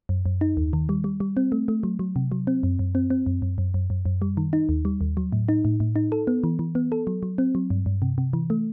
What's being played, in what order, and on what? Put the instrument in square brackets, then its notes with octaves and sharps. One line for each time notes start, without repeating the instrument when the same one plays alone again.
[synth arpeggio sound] F#2
F#2
D#4
D#2
D#3
G3
G3
G3
C4
A3
A3
F#3
F#3
C3
F#3
C4
F#2
F#2
C4
C4
F#2
F#2
F#2
F#2
F#2
F#2
G3
D#3
D#4
D#2
G3
D#2
F#3
A2
D#4
A2
A2
D#4
A4
B3
E3
E3
B3
A4
F#3
F#3
C4
F#3
G2
G2
C3
C3
E3
A3